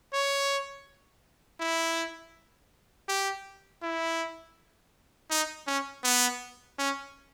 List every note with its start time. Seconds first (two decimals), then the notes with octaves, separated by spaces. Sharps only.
0.13 C#5
1.60 E4
3.08 G4
3.82 E4
5.31 D#4
5.67 C#4
6.04 B3
6.79 C#4